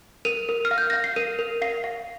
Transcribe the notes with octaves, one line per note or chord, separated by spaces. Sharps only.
A#4 D#7
A#4
F6
F5
G6
F5 A#6
C7
A#4 D#7
A#4
F5 C7
F5